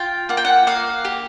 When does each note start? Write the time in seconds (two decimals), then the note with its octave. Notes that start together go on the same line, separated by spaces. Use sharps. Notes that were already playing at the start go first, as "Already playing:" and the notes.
Already playing: F4 G5
0.29 A#3 F#5
0.37 G5
0.45 F#5
0.67 A#3 F5
1.05 G4